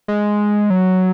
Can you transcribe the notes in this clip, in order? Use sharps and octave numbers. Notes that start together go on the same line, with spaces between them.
G#3
F#3